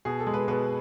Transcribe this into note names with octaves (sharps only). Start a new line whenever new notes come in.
B2 G#4
A4
G#3
B4
B2 B4